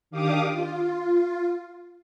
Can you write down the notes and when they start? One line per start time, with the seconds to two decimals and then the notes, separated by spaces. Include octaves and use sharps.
0.11 D#3 D4 G4 F5 D6 D#6
0.49 F4